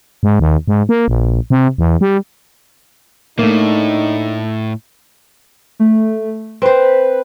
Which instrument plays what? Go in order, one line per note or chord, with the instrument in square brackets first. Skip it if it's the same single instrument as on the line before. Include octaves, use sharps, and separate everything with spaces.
[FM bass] G#2
D#2
G#2
A#3
A#1
C3
E2
G3
[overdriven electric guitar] A2 [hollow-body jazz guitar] A3 A#3 [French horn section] D4 D#4
[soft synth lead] A3
[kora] C4 C5 [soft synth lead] B4